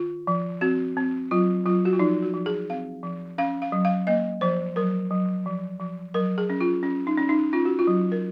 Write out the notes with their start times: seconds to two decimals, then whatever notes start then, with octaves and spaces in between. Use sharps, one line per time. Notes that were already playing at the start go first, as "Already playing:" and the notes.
Already playing: D#3 F4
0.27 F3
0.61 C4 F#4
0.97 C4
1.31 F#3 F4
1.66 F#3 F4
1.85 F#4
1.93 F4
1.99 F3 D#4
2.22 F#4
2.34 F3
2.46 G#4
2.70 C4 F5
3.03 F3
3.38 C#4 F5
3.62 F5
3.72 F#3
3.85 F5
4.07 A#3 D#5
4.41 F3 C5
4.76 F#3 A#4
5.11 F#3
5.46 F3
5.80 F3
6.14 F#3 A#4
6.38 G#4
6.50 C#4
6.61 F4
6.83 C#4
7.07 D#4
7.18 C#4
7.29 D#4
7.53 C#4 F4
7.65 F#4
7.79 F4
7.87 F#3
8.12 A#4